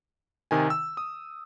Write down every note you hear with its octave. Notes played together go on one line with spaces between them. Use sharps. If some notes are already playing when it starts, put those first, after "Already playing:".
C3 D#3 G#5
E6
D#6